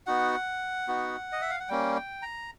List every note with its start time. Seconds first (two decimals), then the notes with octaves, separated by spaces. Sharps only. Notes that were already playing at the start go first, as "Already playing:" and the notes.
0.06 B3 D#4 F#4 F#5
0.88 B3 D#4 F#4
1.32 D#5
1.42 E5
1.50 F5
1.60 F#5
1.68 G3 A#3 C#4 G5
1.96 G5
2.22 A#5